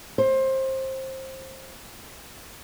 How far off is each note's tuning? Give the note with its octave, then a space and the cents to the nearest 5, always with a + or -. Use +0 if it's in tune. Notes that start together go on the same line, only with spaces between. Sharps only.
C5 +20